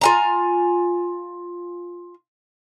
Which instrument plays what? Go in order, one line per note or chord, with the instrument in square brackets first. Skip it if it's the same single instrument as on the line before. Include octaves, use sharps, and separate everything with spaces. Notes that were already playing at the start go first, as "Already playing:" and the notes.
[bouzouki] F4 G#5 A#5